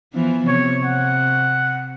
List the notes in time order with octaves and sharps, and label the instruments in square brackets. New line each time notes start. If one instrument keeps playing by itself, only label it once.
[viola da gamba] E3 F3 B3
[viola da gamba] C3 [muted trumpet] C#5
[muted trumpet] F#5